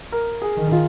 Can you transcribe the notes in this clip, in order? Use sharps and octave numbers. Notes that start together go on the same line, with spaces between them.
A#4
G#4
D#3
F4